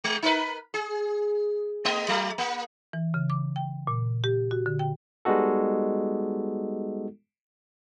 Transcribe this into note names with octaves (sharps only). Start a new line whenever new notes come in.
G#3
D#4 A#4 B4
G#4
A3 B3 D#5
F#3 A3
A#3
E3
C#3
D6
G5
A#2
G4
F#4
D3
G5
G3 G#3 B3 D#4 F#4 A4